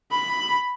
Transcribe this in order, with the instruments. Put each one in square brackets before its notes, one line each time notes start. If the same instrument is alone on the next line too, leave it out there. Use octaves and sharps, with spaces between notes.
[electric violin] B5